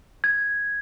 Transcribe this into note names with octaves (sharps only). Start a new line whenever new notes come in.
G#6